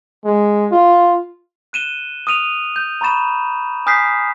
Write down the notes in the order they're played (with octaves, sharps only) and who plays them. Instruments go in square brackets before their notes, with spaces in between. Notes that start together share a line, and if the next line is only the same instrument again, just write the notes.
[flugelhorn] G#3
F4
[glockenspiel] F#6 D#7 E7 G7
D#6 F6 D#7 F7
G6
A#5 B5 C#6 A6 E7
G#5 D#6 F6 G6 B6 C7